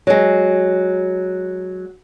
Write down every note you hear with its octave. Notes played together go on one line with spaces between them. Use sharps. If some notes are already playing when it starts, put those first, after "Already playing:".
F#3 G#3